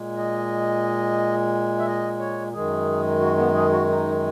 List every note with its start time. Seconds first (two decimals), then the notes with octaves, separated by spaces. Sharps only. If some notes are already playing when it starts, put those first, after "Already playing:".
Already playing: A#2 G#3
0.17 D#5
1.79 E5
1.86 D#5
2.20 C#5
2.53 F#2 D#3 G#3 G#4
3.21 F#4
3.37 B3
3.54 G#4
3.71 F#4
3.88 D#4